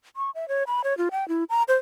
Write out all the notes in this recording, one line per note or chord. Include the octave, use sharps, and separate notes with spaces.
C#6
E5
C#5
B5
C#5
F4
G5
E4
A#5
C5